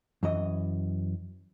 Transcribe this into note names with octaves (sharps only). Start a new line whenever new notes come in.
F#2 E3 D#5